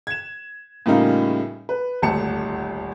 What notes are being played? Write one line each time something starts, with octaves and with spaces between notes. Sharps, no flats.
G#6 E7
A2 C#3 G3 A#3 D#4 F4
B4
D#1 G#1 D2 A5 C#7